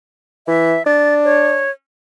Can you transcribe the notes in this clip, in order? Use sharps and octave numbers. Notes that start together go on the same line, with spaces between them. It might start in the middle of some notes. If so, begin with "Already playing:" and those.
E3 E5
D4 A6
C#5